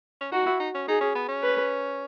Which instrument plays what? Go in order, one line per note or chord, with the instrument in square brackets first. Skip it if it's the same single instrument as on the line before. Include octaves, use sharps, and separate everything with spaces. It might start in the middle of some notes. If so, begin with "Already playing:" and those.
[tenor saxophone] C#4
[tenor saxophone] D#4 [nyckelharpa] F#4
[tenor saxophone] E4
D#4
C#4
[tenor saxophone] D#4 [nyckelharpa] G#4
[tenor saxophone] C#4
B3
C#4
[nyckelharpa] B4